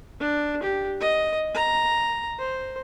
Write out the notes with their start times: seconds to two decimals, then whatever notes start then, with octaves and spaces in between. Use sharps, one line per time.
0.20 D4
0.63 G4
1.01 D#5
1.54 A#5
2.39 C5